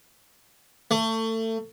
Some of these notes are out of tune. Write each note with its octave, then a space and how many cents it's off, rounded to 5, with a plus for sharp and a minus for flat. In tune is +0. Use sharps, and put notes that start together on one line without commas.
A3 +30